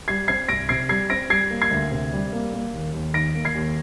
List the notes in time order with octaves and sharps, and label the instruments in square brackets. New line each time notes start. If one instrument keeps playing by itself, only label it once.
[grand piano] G3 G#6 C7
C4 G#6 C7
C2 A#6 D7
C3 G#6 C7
G3 G#6 C7
C4 A#6 D7
G3 G#6 C7
A#3
G#6 C7
D2
C3
G3
A#3
A#3
D#2
D#2
D#3 A#6 D7
A#3
G#6 C7
D#2